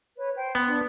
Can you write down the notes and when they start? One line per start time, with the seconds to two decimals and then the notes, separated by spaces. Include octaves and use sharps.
0.16 B4 C#5
0.35 C5 G5
0.55 B3 C6
0.67 D4